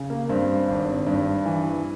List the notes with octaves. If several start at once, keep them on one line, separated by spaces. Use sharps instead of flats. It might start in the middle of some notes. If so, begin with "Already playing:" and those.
Already playing: C#3
A#3
G2 C4
G#1
G2
E3